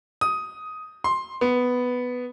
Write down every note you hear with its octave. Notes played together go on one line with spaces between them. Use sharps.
D#6
C6
B3